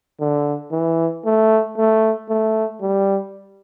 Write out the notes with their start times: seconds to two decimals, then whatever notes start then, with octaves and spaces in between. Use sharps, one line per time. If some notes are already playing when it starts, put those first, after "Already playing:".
0.20 D3
0.72 E3
1.25 A3
1.78 A3
2.29 A3
2.81 G3